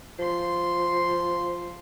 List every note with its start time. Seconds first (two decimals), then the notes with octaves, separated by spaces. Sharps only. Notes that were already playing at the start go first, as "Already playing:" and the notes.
0.19 F3 C6